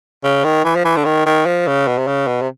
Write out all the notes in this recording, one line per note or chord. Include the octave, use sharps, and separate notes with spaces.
C#3
D#3
E3
F3
E3
D3
D#3
D#3
F3
C#3
B2
C3
C#3
B2
C3